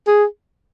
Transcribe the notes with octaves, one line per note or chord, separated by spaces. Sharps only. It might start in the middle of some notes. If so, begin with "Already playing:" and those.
G#4